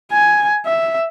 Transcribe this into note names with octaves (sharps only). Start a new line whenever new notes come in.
G#5
E5